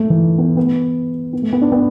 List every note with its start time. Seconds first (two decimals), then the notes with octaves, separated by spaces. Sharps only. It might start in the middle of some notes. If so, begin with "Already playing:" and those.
Already playing: A3
0.10 E3
0.38 B3
0.57 B3
1.33 B3
1.42 A3
1.53 B3
1.62 D4
1.72 B3